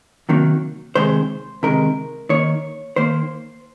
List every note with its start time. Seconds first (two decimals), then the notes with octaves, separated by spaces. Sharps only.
0.29 C3 D#3 F#3 A#3
0.95 C3 D#3 G#3 C5
1.63 C3 D#3 G#3 A#4
2.29 D#3 A#3 C#5
2.96 D#3 A#3 C5